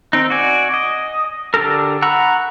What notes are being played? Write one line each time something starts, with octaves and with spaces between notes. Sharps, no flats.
D#3 C4 D#4
F#4 D5 G#5
D#5
D3 D4 G4 A4 A#4
F#5 A#5 B5 C#6 E6